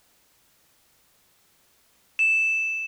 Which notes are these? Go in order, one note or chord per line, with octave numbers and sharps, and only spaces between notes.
E7